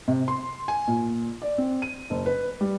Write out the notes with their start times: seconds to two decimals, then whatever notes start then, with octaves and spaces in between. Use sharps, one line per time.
0.08 C3
0.28 C6
0.68 G#5
0.87 A#2
1.42 D5
1.58 C4
1.82 D#7
2.10 F#1
2.26 B4
2.61 G3